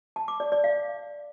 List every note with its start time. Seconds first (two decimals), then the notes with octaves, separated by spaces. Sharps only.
0.16 A5
0.28 D6
0.40 D5
0.52 D5
0.64 F5